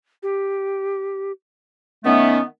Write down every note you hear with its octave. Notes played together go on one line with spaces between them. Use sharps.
G4
D#3 A3 B3 C#4